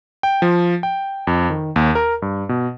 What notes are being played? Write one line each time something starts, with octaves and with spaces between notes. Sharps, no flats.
G5
F3
G5
F2
D#3
D#2
A#4
G2
B2